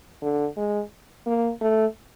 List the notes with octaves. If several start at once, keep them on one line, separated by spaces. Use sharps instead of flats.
D3
G#3
A#3
A3